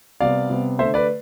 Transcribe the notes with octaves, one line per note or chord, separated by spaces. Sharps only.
C3 G3 B3 D5 F5
C3 G3 B3
D3 A3 C5 E5
B4 D5